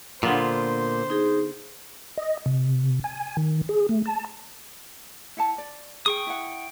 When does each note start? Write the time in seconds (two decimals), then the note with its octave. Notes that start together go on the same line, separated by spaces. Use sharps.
0.23 A#2 D3 B3 F4 C5
1.10 D#4 G#4
2.17 D#5
2.46 C3
3.04 G#5
3.37 D#3
3.69 G#4
3.89 A3
4.06 A5
5.37 E4 F#5 A5
5.58 D5
6.06 G#4 G5 C#6 D#6
6.27 E4 F#5